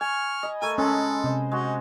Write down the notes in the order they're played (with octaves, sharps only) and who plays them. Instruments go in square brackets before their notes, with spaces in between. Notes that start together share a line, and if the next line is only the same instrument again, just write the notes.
[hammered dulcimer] G#5 [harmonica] C#6 F6
[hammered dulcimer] D#5 B5
[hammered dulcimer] A3 A4 A#4 [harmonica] G#5
[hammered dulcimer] G#3 G#5 B5 [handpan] C#4 [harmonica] A4
[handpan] C3 [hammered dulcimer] C5 D#5
[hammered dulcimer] G#3 F#4 [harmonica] D#4